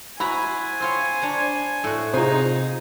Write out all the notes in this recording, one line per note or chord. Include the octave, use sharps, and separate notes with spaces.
E4 F#4 C5 G#5 A#5 B5
C4 F4 C#5
D4 C#5 A#5
A2 F#4
C3 D#4 F4 G#4 C5 G#5